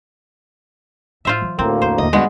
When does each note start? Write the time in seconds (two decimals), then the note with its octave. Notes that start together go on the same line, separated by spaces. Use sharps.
1.25 A2 F4 C5 E5
1.42 E3 F#3
1.59 D2 A2 A#3 C4 D#4 F4
1.82 E2 C5
1.98 D#2 D3 D#5
2.13 G2 G#3 B3 F#4